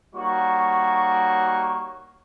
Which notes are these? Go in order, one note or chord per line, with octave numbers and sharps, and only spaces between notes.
G3 A#3 D#4 F#4 C#5 C#6